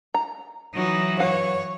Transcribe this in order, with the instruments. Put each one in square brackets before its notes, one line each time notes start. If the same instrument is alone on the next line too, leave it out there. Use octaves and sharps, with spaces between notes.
[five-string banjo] A#5
[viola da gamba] E3 F#3 [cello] D#4
[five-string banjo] B4 F5 F#5 [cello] C#5